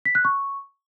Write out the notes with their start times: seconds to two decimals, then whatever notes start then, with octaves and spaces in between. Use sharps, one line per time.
0.05 B6
0.15 F#6
0.25 C#6